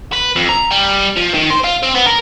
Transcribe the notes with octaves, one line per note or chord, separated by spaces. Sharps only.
B4
F2
A#5
G3
F3
D#3
C5
F4
C4
B3
A#4